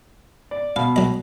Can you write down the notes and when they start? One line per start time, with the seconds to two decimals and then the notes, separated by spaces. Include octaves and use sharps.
0.51 D5
0.76 B2 F5
0.96 F#3 D#5